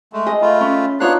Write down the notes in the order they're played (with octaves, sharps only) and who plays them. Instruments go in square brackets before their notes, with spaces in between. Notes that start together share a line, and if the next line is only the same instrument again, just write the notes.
[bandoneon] G#3 A3
[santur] G#4 [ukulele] D#5
[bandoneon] A3 F4 [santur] B5
[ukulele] C#4 [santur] A5
[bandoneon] B3 D4 F#6 [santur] D#4 F4 [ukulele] C#5 F5